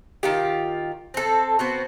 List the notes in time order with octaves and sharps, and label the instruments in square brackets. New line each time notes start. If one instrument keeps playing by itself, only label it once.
[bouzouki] D#3 F4 G4
C4 A4
B3 C4 F#4